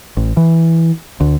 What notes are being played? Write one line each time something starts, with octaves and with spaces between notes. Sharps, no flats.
A1
E3
D2